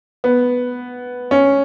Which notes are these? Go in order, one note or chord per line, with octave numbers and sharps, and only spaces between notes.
B3
C#4